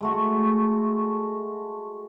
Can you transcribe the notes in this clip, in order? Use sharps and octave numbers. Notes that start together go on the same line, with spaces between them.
G#3 A3 F#4